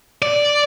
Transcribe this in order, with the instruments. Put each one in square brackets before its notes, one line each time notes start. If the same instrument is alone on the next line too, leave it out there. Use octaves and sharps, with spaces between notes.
[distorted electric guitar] D5